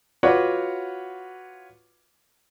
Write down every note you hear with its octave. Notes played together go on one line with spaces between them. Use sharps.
F4 F#4 B4 C#5 F#5 D6